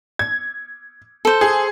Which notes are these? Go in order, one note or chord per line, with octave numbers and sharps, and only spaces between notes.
G#6
A4 C5
G#4